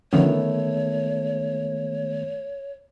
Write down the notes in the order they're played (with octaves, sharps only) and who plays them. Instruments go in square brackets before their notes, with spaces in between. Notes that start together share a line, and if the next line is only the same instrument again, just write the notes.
[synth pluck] D3 F3 C#4 [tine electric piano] D#3 A3 B3 [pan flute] C#5